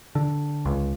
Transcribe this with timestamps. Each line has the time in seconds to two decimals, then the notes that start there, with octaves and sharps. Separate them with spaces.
0.15 D3
0.65 C#2